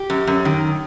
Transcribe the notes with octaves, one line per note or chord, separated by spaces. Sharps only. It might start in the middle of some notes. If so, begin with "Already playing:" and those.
Already playing: G4
F#2
F#2
D#3